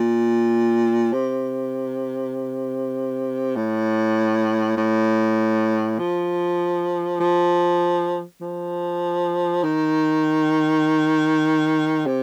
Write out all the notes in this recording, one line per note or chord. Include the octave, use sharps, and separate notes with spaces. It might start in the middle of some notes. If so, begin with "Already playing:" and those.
Already playing: A#2
C3
A2
A2
F3
F3
F3
D#3
C3